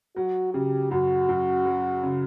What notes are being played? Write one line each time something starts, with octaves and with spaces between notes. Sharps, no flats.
F#3 F#4
C#3 G4
F#2 F#4
F#2
F#3
C#3